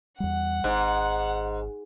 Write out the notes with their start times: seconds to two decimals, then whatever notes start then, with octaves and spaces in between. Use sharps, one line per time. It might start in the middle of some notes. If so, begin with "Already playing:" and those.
0.20 E2 G3 F#5
0.64 G#1 G#2